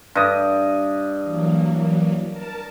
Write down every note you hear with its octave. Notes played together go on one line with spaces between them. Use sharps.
G2 D#5
E3 F#3 A#3
A#4 A5